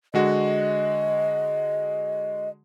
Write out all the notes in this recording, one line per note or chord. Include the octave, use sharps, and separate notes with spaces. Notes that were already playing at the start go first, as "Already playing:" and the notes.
D3 G#3 F#4 D#5